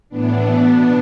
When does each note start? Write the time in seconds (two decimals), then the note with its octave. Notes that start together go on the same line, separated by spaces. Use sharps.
0.09 A2 E3 B3 D4
0.47 B2